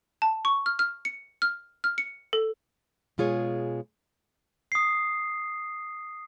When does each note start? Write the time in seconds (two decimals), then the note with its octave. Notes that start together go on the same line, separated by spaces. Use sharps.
0.22 A5
0.45 C#6
0.66 F6
0.79 F6
1.05 C#7
1.42 F6
1.84 F6
1.98 C#7
2.33 A4
3.18 B2 G#3 F4 G#4 C#5
4.72 D#6 C7